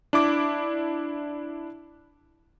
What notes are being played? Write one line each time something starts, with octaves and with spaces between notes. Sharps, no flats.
D4 E4 D6